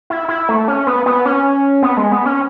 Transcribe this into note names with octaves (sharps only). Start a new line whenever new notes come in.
E4
E4
A3
C#4
B3
B3
C#4
B3
G#3
B3
C#4